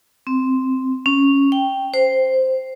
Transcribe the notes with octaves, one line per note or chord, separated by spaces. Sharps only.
C4
C#4
G5
C5